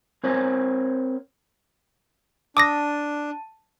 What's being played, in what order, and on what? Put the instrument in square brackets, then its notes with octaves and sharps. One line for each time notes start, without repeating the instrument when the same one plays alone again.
[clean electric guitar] C4 A#4 C5 C#5 G#5
[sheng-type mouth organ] D4 [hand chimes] A5 [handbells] D6 D#6 A#6